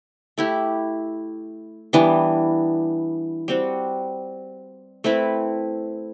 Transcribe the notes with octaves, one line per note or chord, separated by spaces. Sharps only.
A3 E4 G4
E3 G3 B3 D4
G3 C4 F#4
A3 C4 E4 B4